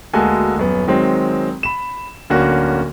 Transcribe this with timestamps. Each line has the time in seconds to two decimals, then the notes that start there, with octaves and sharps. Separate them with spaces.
0.14 D2 G#3 A#3 F#4 A4 G#5
0.57 D#1 F#2 B3
0.87 D#3 F#3 G#3 C4
1.63 B5 E7
2.30 D1 D3 A#3 C#4 F#4